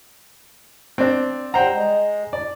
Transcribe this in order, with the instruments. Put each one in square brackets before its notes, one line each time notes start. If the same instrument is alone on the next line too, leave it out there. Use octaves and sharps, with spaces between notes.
[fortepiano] C4 D4
[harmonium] G3 F#5 G5 [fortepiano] C5 A#5
[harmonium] G#3
[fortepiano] D5